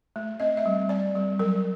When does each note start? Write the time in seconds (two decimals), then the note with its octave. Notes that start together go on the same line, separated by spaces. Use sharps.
0.16 A3
0.40 C4 D#5
0.57 E5
0.66 G3
0.89 C4 D5
1.15 G3
1.39 F#3 A#4